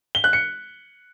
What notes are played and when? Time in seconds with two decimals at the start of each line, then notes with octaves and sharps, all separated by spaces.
0.15 G7
0.24 F#6
0.33 C#7